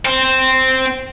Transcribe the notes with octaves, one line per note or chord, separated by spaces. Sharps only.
C4